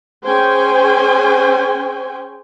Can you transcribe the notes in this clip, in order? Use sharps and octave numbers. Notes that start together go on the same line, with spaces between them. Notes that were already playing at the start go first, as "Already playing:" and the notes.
C#4 G#4 C5 G5 G#5